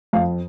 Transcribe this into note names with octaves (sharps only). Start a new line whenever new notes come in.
F2 F5